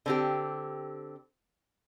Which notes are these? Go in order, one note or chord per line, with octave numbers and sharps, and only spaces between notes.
D3 C4 G4